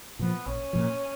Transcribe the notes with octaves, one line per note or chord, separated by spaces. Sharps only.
A#2 F3 B3
A#1 C#4
A#2 F3